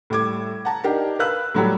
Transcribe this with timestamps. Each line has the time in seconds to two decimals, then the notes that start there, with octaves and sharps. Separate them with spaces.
0.10 A2 G3 D6 G#6
0.65 F#5 A5 A#5
0.84 D4 D#4 G4 A#4
1.19 A#4 B4 F5 B5 E6 F#6
1.55 A2 F#3 G3